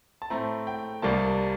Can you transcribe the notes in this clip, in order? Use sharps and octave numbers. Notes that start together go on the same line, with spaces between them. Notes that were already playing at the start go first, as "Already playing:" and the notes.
A5
A2 A3 C4 A#5
G5
C2 C3 G3 A#3 A5